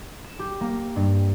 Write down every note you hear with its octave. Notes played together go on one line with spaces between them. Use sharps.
E7
G4
A#3
G2